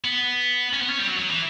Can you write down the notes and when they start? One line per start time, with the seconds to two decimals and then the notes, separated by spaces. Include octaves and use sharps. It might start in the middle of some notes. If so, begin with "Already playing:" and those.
0.04 B3
0.73 C#4
0.81 B3
0.90 C#4
0.99 G3
1.07 F#3
1.18 F#3
1.30 E3